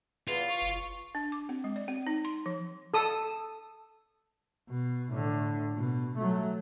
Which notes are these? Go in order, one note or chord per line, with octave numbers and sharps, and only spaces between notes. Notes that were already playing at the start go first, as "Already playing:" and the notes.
E2 F4
C#6
F#1
D4
D6
C4
G#3
D5
C4
D#4
C6
F3
A4 D#6
B2
A2 D3
B2
F#3 A3